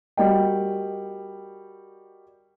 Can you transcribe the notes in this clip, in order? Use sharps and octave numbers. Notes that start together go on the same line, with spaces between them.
G3 F#4 A#4 D#5 G5